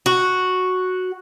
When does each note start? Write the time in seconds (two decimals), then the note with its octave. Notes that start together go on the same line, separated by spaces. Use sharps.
0.06 F#4